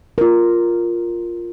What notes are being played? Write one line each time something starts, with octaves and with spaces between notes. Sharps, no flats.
F4 A#4